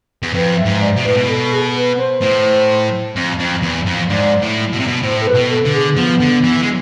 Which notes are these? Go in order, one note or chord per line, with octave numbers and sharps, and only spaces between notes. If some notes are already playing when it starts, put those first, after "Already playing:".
E2
F2 B4
E5
G#2
D5
B2
A2 B4
B2
A4
G#4
B4
C5
A2 C5
F2
F2
E2
F2
G#2 D5
A2
B2
C3
B2
A2 C5
A4
B4
B2
A4
D3
G#4
F3 B3
D3
E3
G#3